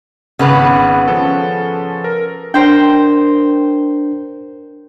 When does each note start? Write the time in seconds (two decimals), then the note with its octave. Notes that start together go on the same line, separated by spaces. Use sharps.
0.39 G#1 C#3 B3 B4
1.08 F3 C#4 A4
2.04 A#4
2.54 D4 A#4 C5 G5